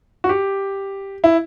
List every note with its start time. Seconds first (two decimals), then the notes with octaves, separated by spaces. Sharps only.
0.24 F#4
0.29 G4
1.24 E4